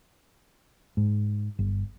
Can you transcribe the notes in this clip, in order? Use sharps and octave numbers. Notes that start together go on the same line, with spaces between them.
G#2
G1